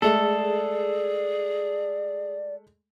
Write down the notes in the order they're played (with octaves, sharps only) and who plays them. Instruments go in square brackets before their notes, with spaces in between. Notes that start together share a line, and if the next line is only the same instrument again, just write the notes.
[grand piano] G#3 A3 [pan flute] G#4 [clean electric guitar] A4 [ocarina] D5